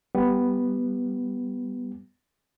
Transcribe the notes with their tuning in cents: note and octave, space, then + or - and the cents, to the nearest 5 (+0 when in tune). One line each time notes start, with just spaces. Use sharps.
G3 +0 B3 +0